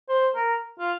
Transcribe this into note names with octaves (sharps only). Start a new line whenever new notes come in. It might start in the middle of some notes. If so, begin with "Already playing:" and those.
C5
A#4
F4